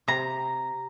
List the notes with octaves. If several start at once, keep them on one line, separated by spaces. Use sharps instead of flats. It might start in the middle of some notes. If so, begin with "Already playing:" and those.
C3 A#5